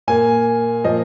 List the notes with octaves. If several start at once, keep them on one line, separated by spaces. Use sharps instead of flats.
A#2 A#3 G#5
A#2 F3 A#3 D#5